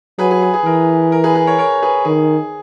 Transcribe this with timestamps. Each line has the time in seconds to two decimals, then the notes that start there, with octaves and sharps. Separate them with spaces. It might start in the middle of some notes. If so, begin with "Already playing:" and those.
0.19 F#3 G#4 B4
0.31 G#4
0.42 G#4
0.54 G#4
0.65 E3 A#4
1.12 A#4
1.24 G#4 B4
1.35 G#4 B4
1.47 A#4 C#5
1.58 A#4 C#5
1.82 G#4 B4
2.05 D#3 G#4